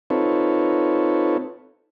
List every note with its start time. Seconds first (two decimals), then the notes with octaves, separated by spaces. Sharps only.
0.10 C4 D#4 F4 A4 B4 C#5